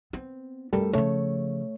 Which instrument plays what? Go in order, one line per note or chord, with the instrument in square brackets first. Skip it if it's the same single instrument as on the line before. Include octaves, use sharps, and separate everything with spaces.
[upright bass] B3 C4
[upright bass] F#2 A3 [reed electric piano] G3 A4 A#4
[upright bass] C#3 F3 [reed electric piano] A3 C#5